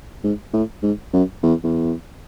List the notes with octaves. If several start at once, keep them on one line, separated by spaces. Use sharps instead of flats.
G#2
A2
G#2
F#2
E2
E2